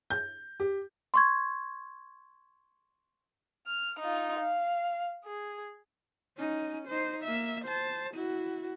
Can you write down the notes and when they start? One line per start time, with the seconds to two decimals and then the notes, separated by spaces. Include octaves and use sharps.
0.10 G6
0.60 G4
1.14 C6 C#6 G#6
3.67 F6
3.99 D#4 F4
4.40 F5
5.25 G#4
6.38 C#4 D#4
6.88 D#4 C5
7.24 A#3 E5
7.65 C5 A5
8.14 E4 F#4